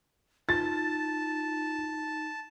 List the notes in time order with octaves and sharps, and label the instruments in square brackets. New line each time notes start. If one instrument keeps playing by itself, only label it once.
[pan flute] D#4 [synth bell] F4 [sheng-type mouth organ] A5 [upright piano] A6